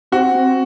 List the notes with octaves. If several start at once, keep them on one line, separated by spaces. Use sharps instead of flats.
C4 F#4
C4